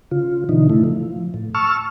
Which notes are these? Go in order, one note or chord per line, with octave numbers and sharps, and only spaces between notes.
C#3 F4
B2 D3 E3 D#4
A2 C#3 A3 E4
F3
A2
A5 C#6 E6 F6